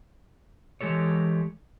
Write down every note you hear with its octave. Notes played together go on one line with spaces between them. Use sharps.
E3 G#3 G4 A4 C#5